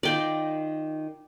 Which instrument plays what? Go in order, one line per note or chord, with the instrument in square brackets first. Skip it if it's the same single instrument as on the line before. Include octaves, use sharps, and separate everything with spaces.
[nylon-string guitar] D#3 D#4 F4 [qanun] D5 G5